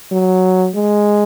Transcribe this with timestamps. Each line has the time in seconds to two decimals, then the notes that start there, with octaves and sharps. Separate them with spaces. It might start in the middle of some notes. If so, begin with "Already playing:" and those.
0.12 F#3
0.75 G#3